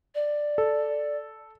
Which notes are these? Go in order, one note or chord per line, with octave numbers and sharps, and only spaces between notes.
D5
A4